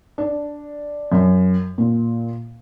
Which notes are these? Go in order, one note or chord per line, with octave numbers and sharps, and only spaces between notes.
D4
F#2
A#2